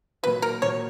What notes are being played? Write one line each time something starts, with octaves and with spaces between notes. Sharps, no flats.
A#2 F#3 A#3 B4
A#4
A#2 F#3 A#3 C#5